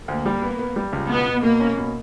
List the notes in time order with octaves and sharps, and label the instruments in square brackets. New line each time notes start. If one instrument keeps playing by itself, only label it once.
[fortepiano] D2 [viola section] A#3
[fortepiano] G3
B3
B3
G3
C#2
[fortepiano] B2 [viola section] B3
[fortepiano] B2
[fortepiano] B2 [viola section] A#3
[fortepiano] C#4
B2